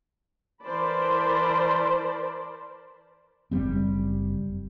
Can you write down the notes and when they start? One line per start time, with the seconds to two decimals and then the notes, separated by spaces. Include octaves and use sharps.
0.63 E3 A#4 C5 D5 A5 B5
3.51 F#1 G3 C4